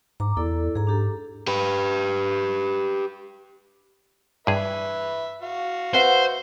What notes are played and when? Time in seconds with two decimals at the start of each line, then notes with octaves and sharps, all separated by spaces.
0.20 G#2 A#5 D6
0.37 E2 E4 A4 D5
0.75 G#2 G#4 A#5
0.87 D4 G4 A4
1.47 G4 B4
4.47 G2 G#4 B4 E5
5.42 F#4 F5
5.94 B4 C5 E5 F#5